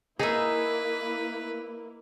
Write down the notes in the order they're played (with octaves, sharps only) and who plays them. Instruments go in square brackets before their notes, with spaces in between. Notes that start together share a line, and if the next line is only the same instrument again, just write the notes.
[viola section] A#3 E4 [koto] D#4 E5 [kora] G#4 [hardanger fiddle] B4